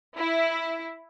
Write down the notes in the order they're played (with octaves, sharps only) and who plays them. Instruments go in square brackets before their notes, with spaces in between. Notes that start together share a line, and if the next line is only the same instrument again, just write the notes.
[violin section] E4